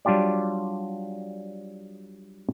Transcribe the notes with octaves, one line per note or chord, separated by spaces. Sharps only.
F#3 G3 D4 F4 G4 D5